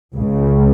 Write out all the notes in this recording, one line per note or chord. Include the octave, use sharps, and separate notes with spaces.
C#2 C#3